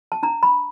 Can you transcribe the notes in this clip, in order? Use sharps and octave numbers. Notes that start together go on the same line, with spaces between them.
A5
D4 A#5
B5